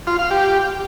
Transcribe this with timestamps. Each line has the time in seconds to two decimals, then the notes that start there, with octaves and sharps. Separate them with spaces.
0.07 F4
0.19 F5
0.31 G4